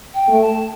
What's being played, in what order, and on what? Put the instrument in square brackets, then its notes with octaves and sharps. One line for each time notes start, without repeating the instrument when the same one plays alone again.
[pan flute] G5
[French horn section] A3
[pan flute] A5